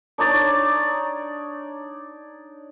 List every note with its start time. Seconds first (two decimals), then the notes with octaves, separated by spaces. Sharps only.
0.18 D4 D#4 C#5 D5